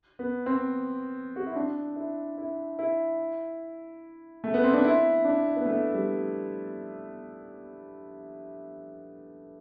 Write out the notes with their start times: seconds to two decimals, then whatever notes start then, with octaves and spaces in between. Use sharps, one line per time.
0.19 B3
0.46 C4
1.36 F#4
1.47 E4
1.56 D4
1.96 E4
2.38 E4
2.79 E4
4.44 A3
4.54 B3
4.64 C4
4.73 D4
4.84 E4
5.25 D4
5.56 B3
5.66 A3
5.93 G3